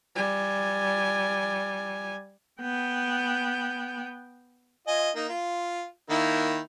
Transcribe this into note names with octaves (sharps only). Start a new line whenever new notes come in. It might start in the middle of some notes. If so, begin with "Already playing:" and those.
G3 G#5
B3 G5
F4 D#5 G#5
A#3 D#4
F4
D#3 A#3 E4